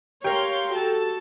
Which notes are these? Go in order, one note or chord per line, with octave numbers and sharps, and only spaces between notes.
G4 A#4 C#5 F5 G5 C6
F#4 A4 A5